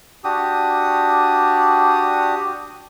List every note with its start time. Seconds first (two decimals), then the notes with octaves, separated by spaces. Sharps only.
0.24 D4 F#4 G4 D#6